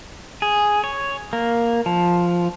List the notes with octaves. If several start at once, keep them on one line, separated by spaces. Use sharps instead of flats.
G#4
C#5
A#3
F3